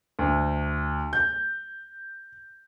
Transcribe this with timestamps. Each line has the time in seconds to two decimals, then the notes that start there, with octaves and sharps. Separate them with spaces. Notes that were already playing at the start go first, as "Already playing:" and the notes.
0.19 D2
1.13 G6